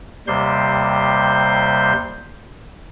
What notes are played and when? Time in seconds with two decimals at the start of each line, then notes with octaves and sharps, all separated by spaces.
0.28 D#2 C3 G3 C5 C6